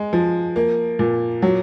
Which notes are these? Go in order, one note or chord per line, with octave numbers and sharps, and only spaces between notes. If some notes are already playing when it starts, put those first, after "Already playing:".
Already playing: G#3
F3
A#3
A#2
F#3